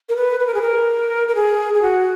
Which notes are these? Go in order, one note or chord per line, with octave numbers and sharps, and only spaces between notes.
A#4
B4
B4
A#4
G#4
A#4
A#4
G#4
G#4
F#4